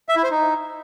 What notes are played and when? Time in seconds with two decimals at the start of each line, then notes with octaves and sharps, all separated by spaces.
0.09 E5
0.16 E4
0.23 C5
0.31 D#4